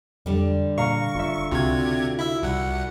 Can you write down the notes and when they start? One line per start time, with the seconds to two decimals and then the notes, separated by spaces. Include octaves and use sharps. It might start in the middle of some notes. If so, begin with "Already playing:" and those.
0.26 F2 D3 G3
0.78 A#2 F5 A#5 C#6
1.15 F#1 F4 E5
1.52 C#2 C3 F4 F#4 G#6
2.19 E4 E5
2.42 C2 F#5